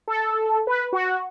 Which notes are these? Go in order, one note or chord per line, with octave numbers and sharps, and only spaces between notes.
A4
B4
F#4